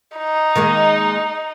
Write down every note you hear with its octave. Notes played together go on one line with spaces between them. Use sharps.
D#4
D#3 G#3 A#3